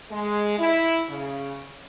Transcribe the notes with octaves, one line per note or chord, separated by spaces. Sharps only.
G#3
E4
C#3